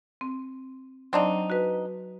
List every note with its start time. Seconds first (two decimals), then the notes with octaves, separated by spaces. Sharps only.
0.21 C4
1.13 F#3 C4 D4 D#4
1.50 F#4 B4